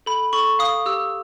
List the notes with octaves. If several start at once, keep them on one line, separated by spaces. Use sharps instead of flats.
A4 B5
A4 C#6
F5 D#6
G4 E6